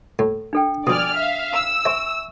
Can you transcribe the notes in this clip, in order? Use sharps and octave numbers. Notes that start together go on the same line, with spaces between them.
A2
D4 A4 G5
B2 F3 D5 G#5 D#6 F6
E5 F5
E6
C5 E5 G#5 C#6